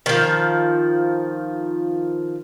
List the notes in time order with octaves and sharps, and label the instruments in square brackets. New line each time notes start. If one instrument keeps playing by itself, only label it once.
[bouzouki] D#3 F3